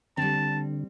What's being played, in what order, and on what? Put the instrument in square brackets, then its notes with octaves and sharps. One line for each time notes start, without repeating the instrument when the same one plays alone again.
[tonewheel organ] D3 [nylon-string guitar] G3 C4 [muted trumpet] A5